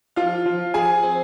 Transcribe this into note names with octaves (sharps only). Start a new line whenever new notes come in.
F3 F4 F5
F3
F3 G#4 G#5
C4